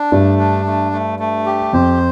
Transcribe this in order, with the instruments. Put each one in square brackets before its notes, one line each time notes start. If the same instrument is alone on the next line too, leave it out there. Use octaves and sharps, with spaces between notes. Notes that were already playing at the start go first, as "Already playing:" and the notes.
Already playing: [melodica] D4
[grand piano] G2 [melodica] A3
[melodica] D4
A3
A3
A3
G4
[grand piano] F2 [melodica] C5